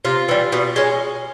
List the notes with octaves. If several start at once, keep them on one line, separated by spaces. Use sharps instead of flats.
C3 F4
E3 G3
B2
G#3 C#4